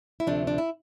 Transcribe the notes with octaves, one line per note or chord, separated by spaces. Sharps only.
E4
D2 C3 F3 A3 D4
D4
E4